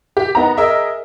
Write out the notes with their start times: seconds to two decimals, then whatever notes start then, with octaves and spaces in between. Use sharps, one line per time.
0.17 G4
0.35 B3 D#4 A#5
0.57 G#4 A#4 D#5 E5